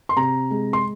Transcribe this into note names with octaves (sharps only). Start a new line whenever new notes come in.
C6
C3 A#5
G#3
C6